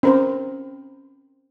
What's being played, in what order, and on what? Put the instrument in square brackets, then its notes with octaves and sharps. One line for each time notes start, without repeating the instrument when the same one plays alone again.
[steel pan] C4 A#4 C5 [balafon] C#4